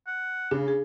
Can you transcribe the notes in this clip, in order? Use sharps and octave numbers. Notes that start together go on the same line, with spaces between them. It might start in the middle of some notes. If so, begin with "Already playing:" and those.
F#5
C#3 D4
G#4